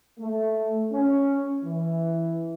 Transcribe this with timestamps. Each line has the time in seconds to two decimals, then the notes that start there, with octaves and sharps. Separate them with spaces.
0.19 A3
0.92 C#4
1.64 E3